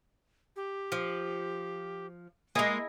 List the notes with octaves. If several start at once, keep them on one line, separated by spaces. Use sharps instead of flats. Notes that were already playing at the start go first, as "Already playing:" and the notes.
G4
F3
G#3 A#3 E4 G#4 D#5